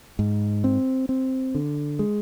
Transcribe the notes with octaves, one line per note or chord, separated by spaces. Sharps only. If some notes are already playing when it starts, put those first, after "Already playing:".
G#2
C4
C4
D3
G#3